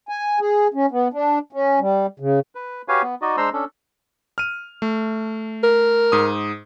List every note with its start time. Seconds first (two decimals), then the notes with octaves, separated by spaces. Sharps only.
0.09 G#5
0.40 G#4
0.74 C#4
0.91 B3
1.13 D4
1.53 C#4
1.80 G3
2.20 C#3
2.55 B4
2.88 F#4 G4 B4 C#5 F5 G#5
3.02 B3
3.22 D#4 F#4 D5 D#5
3.37 G#3 D4 C5 A#5 C6 E6
3.53 C#4 D4 A4
4.38 F6 D#7
4.82 A3
5.63 A#4
6.12 G#2 D#6